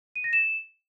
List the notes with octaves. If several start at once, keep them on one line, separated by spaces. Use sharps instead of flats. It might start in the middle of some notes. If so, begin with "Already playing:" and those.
D#7
A#6
E7